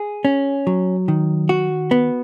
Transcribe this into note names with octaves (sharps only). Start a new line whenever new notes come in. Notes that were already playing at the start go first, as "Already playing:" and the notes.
Already playing: G#4
C#4
F#3
D#3
F#4
B3